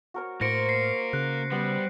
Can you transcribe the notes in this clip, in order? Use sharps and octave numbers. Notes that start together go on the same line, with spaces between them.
F#4 A#4 C#5
A2 A#3 A#4 C5 A#6 C#7 D7
C7 C#7
C#3 F#6
G3 B3 C5